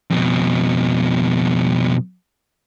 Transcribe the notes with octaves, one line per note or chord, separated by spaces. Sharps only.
F2 B2